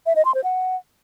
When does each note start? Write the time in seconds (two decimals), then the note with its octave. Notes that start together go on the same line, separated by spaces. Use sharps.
0.06 E5
0.16 D#5
0.25 C6
0.35 C5
0.44 F#5